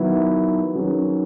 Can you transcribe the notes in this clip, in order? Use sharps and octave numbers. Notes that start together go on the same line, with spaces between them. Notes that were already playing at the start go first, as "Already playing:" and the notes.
Already playing: D#3 F#3 B3 E4
D#3 F#3 C#4 G#4 B4